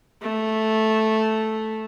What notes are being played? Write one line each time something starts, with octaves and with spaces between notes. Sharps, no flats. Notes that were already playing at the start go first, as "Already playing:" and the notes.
A3